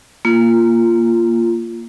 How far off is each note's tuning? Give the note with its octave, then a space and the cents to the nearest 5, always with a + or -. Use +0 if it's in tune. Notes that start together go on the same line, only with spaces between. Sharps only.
A#3 +0 F4 -20